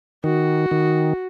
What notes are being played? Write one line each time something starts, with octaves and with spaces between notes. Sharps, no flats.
D#3 F#4
D#3